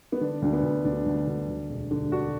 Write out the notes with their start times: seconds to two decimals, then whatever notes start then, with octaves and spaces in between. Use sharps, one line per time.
0.12 B3
0.21 D3 D4
0.42 D2 D4
0.53 B3
0.63 D2
0.85 D2 D4
1.06 D2
1.27 D2
1.49 D2
1.70 E1
1.91 D3
2.12 D3 D4 F#4